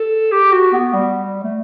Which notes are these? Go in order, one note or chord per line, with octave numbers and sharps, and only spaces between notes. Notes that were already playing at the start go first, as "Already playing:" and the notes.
Already playing: A4
G4
F#4
B3
G3
A3